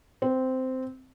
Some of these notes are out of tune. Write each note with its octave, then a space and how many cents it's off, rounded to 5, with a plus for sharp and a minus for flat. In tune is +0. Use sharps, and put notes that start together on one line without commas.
C4 -10